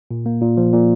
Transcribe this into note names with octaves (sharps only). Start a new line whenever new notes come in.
A#2
A#3
A#2
F3
A#2